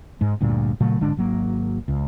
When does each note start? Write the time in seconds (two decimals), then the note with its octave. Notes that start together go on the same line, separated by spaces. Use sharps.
0.21 G#2 G#3
0.41 D2 G2 A#2
0.80 A#2 C#3 F#3 A3
1.00 G#1 D3 G#3 D4
1.17 G#1 F#3 A#3
1.88 C#2